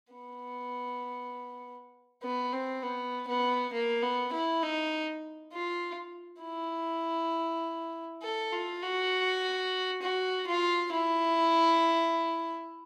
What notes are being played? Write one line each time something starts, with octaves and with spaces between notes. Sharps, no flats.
B3
B3
C4
B3
B3
A#3
B3
E4
D#4
F4
E4
A4
F4
F#4
F#4
F4
E4